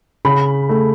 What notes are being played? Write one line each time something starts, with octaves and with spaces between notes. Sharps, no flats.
C#3 B5
A3